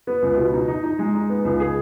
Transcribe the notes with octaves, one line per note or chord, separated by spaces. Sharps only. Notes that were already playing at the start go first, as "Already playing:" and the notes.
B3
C#2
B2
D#4
D#4
D#4
G#3
D#4
B3
C#2
G#4